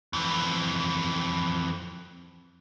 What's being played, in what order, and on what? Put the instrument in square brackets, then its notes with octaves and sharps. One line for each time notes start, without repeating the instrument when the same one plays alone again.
[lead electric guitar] F2 E3